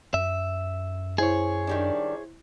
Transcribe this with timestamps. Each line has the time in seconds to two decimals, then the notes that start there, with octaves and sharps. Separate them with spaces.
0.14 F#2 E5
1.18 E4 G#4 C5 C#5
1.67 D#3 G3 D4